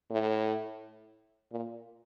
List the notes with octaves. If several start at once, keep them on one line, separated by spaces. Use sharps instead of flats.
A2
A#2